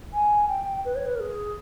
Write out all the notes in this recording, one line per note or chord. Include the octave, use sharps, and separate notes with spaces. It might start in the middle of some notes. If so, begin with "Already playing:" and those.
G#5
G5
B4
C#5
B4
A#4
G#4